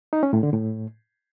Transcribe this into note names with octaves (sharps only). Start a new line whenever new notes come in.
D#4
C#4
A2
D3
A2